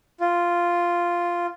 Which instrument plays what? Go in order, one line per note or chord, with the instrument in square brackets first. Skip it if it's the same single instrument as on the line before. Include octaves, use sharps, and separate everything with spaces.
[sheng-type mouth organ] F4